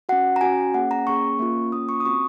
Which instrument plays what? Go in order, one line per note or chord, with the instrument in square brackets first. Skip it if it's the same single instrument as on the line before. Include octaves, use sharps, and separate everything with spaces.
[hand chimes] C#4 F#4 F#5
A#5
C#4 F#4 G#5
A#3 C#4 G#4 F#5
A#5
A#3 C#4 G#4 C#6
A#3 C#4 F4
A#3 C#4 F4 D#6
C#6
D#6
C4 F#4 C#6